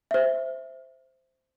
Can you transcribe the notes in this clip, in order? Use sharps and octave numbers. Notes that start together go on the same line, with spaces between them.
C5 E5